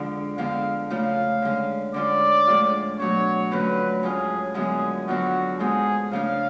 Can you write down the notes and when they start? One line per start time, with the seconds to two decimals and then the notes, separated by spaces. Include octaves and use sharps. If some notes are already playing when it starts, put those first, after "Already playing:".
Already playing: F2 D3 F3 G#3 D4
0.38 F2 D3 G#3 B3 F5
0.90 C#3 F3 A3 F4 F5
1.42 D3 G#3 C#4
1.94 D3 G#3 C#4 F4 D5
2.47 A2 F3 G#3 D4 F4
2.99 B2 F#3 A3 D4 C#5
3.51 F2 D3 F#3 A3 C#4 B4
4.03 A2 G#3 C#4 F4 G#4
4.54 F#2 D3 F3 G#3 B3 G#4
5.08 F2 D3 F#3 B3 F4 F#4
5.59 G#2 G#3 B3 F4 G#4
6.12 C#3 F3 A3 D4 F4 F5